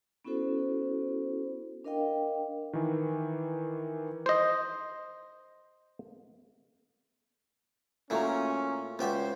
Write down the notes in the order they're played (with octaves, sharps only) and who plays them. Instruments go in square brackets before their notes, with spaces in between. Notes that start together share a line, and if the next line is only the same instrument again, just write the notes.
[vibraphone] B3 C#4 E4 F#4 A4 C5
D4 A#4 D#5 F5 G5
[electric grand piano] D#3 E3
[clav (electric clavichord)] C5 D#5
[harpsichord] A#2 A3 [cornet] C#4 [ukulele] E4 F#4 A#5
[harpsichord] C#2 G4 E5 [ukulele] C#4 F#4 [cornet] C5